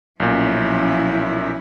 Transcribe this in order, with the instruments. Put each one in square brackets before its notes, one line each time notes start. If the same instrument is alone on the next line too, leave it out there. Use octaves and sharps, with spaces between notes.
[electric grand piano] B1 A#2 [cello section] F3 C#4 E4